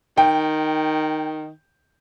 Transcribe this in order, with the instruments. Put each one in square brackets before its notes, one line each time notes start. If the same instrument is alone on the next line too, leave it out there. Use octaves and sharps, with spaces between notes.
[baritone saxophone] D#3 [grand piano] G5